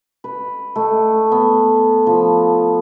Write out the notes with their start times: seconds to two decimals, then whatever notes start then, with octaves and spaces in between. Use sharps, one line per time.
0.24 B4
0.76 A3
1.32 B3
2.07 F3